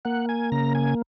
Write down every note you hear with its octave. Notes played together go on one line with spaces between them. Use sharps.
A#3 F#5
G#5
C#3 A#5
G#5